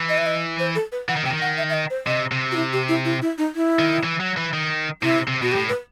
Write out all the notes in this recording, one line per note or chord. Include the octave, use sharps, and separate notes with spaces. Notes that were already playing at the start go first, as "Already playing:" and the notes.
Already playing: E3
D#5
E5
D#5
C5
A4
B4
E3 F#5
D#3
C3 G5
D#3
F#5
E5
E5
D#5
C5
C3 D#5
C3
F#4
E4
G4
E4
E4
E4
D#4
E4
D#3
E3
F#3
E3
D#3
C3 E4
C3
B2 F#4
G4
A2
B4